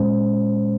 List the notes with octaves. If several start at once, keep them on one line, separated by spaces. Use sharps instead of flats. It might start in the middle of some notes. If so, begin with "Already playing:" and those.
Already playing: A#2 G#3 C#4 C5